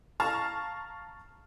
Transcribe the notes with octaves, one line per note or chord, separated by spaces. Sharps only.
F5 A5 A#5 C#6 F6